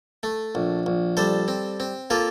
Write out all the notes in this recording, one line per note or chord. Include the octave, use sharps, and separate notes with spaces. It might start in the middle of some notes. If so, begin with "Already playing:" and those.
A3
A#1
A#1
G3 A4 C5
C4
C4
A#3 F4 A4